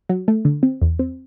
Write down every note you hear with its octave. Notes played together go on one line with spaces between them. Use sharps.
F#3
A3
D3
C4
E2
C4